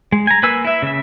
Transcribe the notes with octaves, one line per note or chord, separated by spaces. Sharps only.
G#3
G#5 A#5
A#3 B4 G#5 E6
E4 E5
C#3 E5